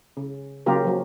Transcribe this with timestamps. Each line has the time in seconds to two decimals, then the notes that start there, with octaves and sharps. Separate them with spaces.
0.17 C#3
0.66 C#3 F#3 A#3 F4 G4 A#4
0.84 F3 F#3